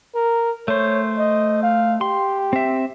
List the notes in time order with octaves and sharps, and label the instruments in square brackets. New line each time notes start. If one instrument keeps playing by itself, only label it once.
[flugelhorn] A#4
[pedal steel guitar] A3 C5 [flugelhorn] C#5
[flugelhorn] D#5
F5
[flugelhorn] G4 [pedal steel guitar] C6
[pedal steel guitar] C4 E5